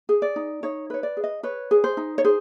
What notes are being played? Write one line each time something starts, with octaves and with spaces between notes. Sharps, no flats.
G#4
D5
D#4
D#4 C#5
B4 C#5
D5
G#4
D#5
B4 C#5
G#4
C5
D#4
C#5
G#4 C5